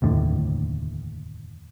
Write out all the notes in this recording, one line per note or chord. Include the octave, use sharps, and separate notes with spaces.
F1 D#2 A2 D3